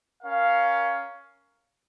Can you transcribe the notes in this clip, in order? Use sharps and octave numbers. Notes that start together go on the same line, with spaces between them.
C#4 A#4 F5